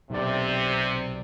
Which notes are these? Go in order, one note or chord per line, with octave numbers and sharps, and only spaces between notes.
B1 C3 D5